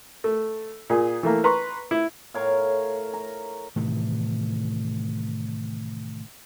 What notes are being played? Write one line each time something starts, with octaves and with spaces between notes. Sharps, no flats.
A3
A#2 G#4
E3 A3 A#3
B4 A#5 C6 C#6
E4
A2 A#4 C#5 F5
A#5
A2 C3 D#3 E3